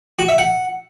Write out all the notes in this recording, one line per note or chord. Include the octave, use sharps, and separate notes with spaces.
F#4
E5
F#5